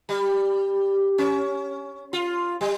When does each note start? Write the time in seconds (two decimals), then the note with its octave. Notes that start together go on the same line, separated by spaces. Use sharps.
0.09 G3
1.18 C#4
2.13 F4
2.61 G3